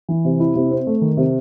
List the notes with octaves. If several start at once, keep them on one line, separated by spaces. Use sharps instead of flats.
E3
C3
E4
C3
C4
A3
D#3
C3